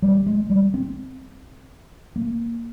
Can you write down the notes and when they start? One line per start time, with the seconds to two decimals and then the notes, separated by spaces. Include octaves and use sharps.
0.02 G3
0.26 G#3
0.50 G3
0.74 C4
2.16 A#3